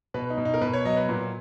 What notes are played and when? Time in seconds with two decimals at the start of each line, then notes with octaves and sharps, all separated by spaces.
0.14 B2 B4
0.30 D#4
0.38 B2
0.45 D#4
0.54 A#4
0.62 B2 B4
0.74 C#5
0.85 F#3 D#5
0.97 B4
1.09 A#2